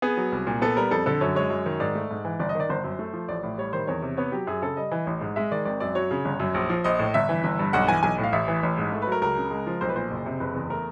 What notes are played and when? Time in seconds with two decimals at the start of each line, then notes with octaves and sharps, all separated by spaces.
0.02 B3 G#4
0.17 F#3
0.32 C2
0.47 A#2
0.62 B3 A4
0.77 G3 A#4
0.91 F2 A4
1.06 D3 A4
1.21 F#2 C#5
1.35 G#3 C#5
1.50 F#2
1.66 D#3
1.80 G#2 D5
1.95 A3
2.11 G#2
2.25 E3
2.40 G1 D5
2.49 D#5
2.55 D#3 D5
2.69 G1 C5
2.84 F#2
2.99 A3
3.13 F3
3.29 A1 D5
3.43 A2
3.58 G3 C#5
3.73 D#3 C5
3.87 E2 C#5
4.02 C3
4.17 B3 C#5
4.32 F#3 G4
4.47 F#2 G#4
4.62 C#3 A4
4.77 G3 D#5
4.91 E3
5.07 A1
5.21 G#2
5.36 G#3 E5
5.51 D#3 D5
5.65 G#1 D5
5.80 F#2 D5
5.95 F#3 C#5
6.11 C#3
6.25 G1
6.40 F#2
6.54 A#1
6.69 F3
6.84 A#1 D#5
6.99 A2
7.14 G1 E5
7.29 E3
7.44 G1
7.59 G2
7.73 B1 F#5
7.88 E3 G#5
8.03 B1 G#5
8.18 A2
8.24 F5
8.33 A1 E5
8.48 E3
8.63 A1
8.77 G#2
8.92 A3
9.02 B4
9.07 F#3 A#4
9.22 C#2 A#4
9.37 C#3
9.51 G#3
9.67 F3
9.81 B1 C5
9.89 B4
9.96 A#2 C5
10.11 F#1
10.26 C3
10.40 F#1 B4
10.55 E2
10.70 A3 A#4